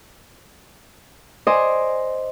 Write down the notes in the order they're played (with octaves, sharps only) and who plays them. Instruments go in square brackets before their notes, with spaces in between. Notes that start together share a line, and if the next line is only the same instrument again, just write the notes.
[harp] C5 D5 D#5 G#5